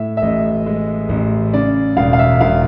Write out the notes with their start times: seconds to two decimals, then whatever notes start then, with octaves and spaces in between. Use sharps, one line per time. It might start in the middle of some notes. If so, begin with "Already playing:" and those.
Already playing: A2 E5
0.17 E5
0.22 A1 D#5
0.66 G#3
1.09 A1
1.54 C#3 D5
1.97 E1 F5
2.13 F5
2.19 E5
2.41 E1 F5